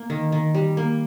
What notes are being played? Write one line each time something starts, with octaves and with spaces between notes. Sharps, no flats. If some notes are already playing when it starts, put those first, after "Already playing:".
Already playing: A#3
D#3
D#3
G3
A#3